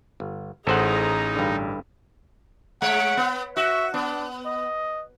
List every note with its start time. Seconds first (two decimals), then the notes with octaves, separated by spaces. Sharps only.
0.20 G1
0.67 A1 D#4 G#4 A4 C5 F#5 A#5
1.36 G2 D3
2.82 G#3 C#5 F#5
3.17 B3
3.56 F#4 E5
3.94 B3 D4
4.45 D#5